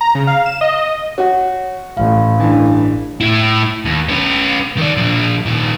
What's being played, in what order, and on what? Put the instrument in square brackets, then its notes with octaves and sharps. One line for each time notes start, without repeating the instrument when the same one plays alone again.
[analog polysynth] A#5
C#3
F5
E7
D#5
[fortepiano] F#4 [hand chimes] C#5 F#5
[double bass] A1 [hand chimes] F5
[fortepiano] G2 E3
[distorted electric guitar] A2 E4
D#2
C#4 B4
D#3 D5
A#2 F3
A#2 D#3